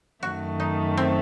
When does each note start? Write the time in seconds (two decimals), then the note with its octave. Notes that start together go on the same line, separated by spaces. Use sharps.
0.23 F#2 D#3 A3 F#4
0.60 D#4
0.97 C4